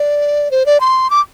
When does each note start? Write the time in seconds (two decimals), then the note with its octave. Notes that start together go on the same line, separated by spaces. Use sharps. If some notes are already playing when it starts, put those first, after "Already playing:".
Already playing: D5
0.51 C5
0.66 D5
0.80 C6
1.10 D6